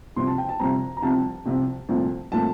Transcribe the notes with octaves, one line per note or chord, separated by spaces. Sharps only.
C2 C3 F3 C4 C6
A5
G5
A5
C2 C3 F3 C4 A#5
A#5
C2 C3 F3 C4 A5
C2 C3 F3 C4
C2 A#2 F3 A3 C4
A#2 F3 A3 C4 A5